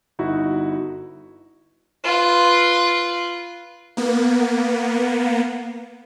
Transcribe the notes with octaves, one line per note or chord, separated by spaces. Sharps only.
G1 D#4 E4 F#4
F4 B4
A#3 B3